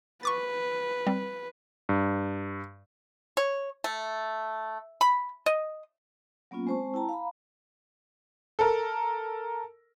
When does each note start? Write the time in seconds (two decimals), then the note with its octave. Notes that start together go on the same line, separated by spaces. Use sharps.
0.23 B4 C#6 D6 A6
1.07 G3 C4
1.89 G2
3.37 C#5
3.84 A3
5.01 B5
5.46 D#5
6.51 F#3 A#3 B3 C#4 F4
6.67 G#3 C4 C5 A5 C#6
6.94 E4 G5 A5 A#5
7.09 F5 A#5 B5
8.59 A4 A#4